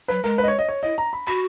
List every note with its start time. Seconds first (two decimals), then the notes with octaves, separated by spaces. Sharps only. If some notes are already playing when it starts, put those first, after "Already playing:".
0.08 F#3 B4
0.24 G#3 A#4
0.38 B4
0.44 D#5
0.48 C#5
0.59 D#5
0.69 C#5
0.83 E4 D#5
0.98 A#5
1.13 B5
1.27 F#4 B5